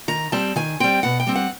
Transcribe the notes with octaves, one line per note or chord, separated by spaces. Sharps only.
D#3 A#5
G3 C4 A5
D#3 G#5
G3 C4 G5
B2 F#5
G5
G3 C4
F#5